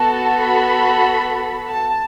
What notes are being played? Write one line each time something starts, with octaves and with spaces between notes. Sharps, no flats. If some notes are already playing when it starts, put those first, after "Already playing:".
Already playing: B3 F#4 A4 A5
B5
A5